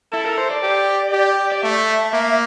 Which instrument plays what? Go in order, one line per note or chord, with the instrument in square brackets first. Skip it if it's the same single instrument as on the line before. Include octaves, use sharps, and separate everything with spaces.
[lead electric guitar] E4 [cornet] A4
[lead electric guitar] A#4
C5
D5
[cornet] G4
G4
[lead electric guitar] D5
[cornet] A3 [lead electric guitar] E5
[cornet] A#3